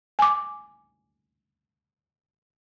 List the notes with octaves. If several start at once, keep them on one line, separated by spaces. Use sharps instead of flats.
G#5 D6